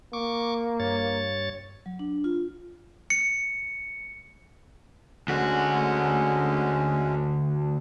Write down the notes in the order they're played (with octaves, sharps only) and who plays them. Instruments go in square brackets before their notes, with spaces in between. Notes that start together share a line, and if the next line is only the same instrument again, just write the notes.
[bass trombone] A#3 [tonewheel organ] C#6 D6
[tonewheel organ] G2 C#5 A6
[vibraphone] F#3
D4
F4
[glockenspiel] C#7
[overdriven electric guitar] D2 F#4 [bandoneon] D3 G#3 C#4